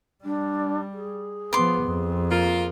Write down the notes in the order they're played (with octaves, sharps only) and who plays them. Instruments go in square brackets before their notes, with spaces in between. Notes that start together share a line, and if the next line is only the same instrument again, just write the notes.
[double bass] G3 [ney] D4
[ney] G#4
[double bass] F3 B3 [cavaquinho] C6 D6
[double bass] F2
[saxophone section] A#3 F4